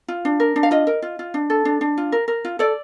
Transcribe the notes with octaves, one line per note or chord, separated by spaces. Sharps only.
F4
D4
A#4
D4
F5
F4 D#5
A#4
F4
F4
D4
A4
D4
D4
F4
A#4
A#4
F4
A4 D5